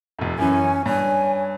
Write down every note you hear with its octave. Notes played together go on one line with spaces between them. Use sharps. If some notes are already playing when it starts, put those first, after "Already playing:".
F1 F2
F#2 E3 C#4 G#5
G2 C#5 G#5